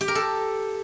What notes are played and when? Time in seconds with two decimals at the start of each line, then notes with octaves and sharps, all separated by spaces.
0.01 G4
0.08 A#4
0.15 A4